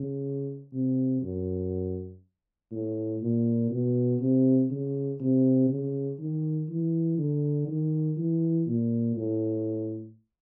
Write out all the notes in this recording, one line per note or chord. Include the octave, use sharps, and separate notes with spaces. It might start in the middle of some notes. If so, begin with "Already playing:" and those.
Already playing: C#3
C3
F#2
A2
A#2
B2
C3
C#3
C3
C#3
D#3
E3
D3
D#3
E3
A#2
A2